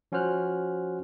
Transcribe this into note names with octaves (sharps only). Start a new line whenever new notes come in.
F3 C#4 F#4 C5 F6 F#6